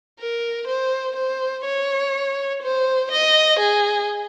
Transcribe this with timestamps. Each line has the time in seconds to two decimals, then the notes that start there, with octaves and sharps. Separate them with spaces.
0.19 A#4
0.67 C5
1.16 C5
1.65 C#5
2.62 C5
3.11 D#5
3.59 G#4